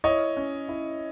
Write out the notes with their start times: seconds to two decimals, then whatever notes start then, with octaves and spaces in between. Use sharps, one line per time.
0.04 E4 C#5 D#5
0.37 C#4
0.69 E4